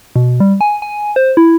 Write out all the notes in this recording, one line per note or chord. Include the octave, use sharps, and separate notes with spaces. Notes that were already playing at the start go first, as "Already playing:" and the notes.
B2
G3
G#5
G#5
C5
E4